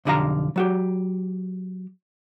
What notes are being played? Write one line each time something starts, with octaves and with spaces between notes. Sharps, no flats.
B1 F2 D3 G4 F5 A#5
F#3 F#4 G4